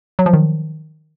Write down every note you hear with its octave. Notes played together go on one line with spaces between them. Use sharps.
F#3
F3
D#3